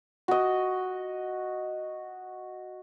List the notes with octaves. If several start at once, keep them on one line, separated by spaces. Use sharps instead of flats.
F#4 D#5